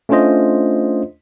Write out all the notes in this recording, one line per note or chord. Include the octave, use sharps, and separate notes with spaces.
A3 C#4 D4 F4 C5 D#5